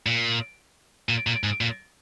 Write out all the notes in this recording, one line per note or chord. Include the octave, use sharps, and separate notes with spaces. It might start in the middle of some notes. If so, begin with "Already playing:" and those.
A#2
A#2
A#2
G#2
A#2